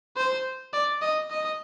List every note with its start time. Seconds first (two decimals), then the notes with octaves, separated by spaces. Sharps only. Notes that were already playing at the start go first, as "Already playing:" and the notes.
0.17 C5
0.73 D5
1.02 D#5
1.31 D#5